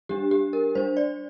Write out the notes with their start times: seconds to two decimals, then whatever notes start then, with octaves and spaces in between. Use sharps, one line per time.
0.09 G3 D4 G4
0.31 G4
0.53 A#4
0.75 G3 D4 C5
0.97 D5